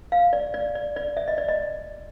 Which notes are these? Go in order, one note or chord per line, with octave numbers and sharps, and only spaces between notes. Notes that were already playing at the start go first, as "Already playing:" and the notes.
F5
D5
D5
D5
D5
E5
D#5
D5
D#5